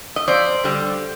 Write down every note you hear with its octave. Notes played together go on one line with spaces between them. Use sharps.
D#5
F2 C5 D5
D3 G3